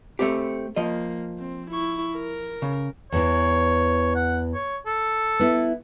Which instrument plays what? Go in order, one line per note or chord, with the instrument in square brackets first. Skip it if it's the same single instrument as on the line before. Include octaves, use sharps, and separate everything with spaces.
[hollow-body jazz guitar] A3 C4 G4
[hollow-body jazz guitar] F3 D#5 [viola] A#3
[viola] C4
E4 C#6
A#4
[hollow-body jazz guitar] C#3
[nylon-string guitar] E2 E3 [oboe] C#5
[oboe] F#5
C#5
A4
[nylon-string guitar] B3 E4